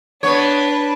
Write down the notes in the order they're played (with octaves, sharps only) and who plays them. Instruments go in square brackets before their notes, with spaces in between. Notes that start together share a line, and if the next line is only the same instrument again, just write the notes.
[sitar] B3 C#5 [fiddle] D4 B4